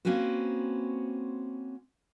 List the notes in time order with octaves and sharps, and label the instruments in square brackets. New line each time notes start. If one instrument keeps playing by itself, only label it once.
[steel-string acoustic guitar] A#3 C4 C#4 F#4 B4 C5